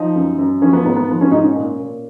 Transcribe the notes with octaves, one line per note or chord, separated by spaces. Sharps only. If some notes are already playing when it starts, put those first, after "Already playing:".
Already playing: F3 D#4
F#2
F#2
F3 C#4
B3
G#2 B3
B3
F3 B3
C#4
G#2 D#4
C#4
A#2
A#2